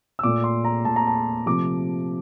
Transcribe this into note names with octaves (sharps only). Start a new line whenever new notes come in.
E6
A#2 A3 D6
C6
A#5
A#2 A3 A5
A#5
A5
C3 F3 A3 D6